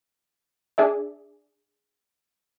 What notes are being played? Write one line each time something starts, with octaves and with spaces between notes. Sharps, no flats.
D4 G#4 D5 E5